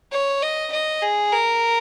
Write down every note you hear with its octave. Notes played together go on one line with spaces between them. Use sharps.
C#5
D#5
D#5
G#4
A#4